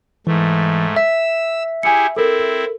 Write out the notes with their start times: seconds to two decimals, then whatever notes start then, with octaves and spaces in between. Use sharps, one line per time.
0.27 G#2 E3 A3
0.96 E5 E6 B6
1.83 E4 G4 G#4 G#5 C#7
2.16 C4 E4 A4 A#4